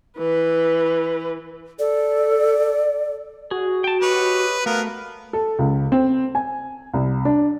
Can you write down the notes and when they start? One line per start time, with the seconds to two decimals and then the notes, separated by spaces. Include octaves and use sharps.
0.18 E3 B4
1.79 A4 D5
3.51 F#4 G#4
3.84 G5 A5
4.02 G4 B4 C#5 D#5
4.66 A3 B3 A#4 F5
5.33 A4
5.59 C#2
5.92 C4
6.35 G#5
6.94 C2
7.25 D4